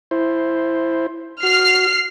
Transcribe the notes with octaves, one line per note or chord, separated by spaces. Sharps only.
E4 C5
F#4 F6 C7